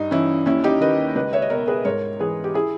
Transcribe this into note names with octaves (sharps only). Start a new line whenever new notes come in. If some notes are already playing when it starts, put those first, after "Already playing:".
Already playing: G2 D#4
E3 C#4 E4
D#2 C#4 E4
D#4 G4
D#3 B4 D#5
C#2 B4 D#5
C#5 E5
D#5
B2 A#4 C#5
G#4 B4
G#2 A#4 C#5
E3 G#4 B4
G4
E4 G#4